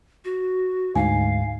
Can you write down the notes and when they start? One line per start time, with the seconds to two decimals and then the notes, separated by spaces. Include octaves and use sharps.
0.25 F#4
0.95 D2 G#2 F5 G#5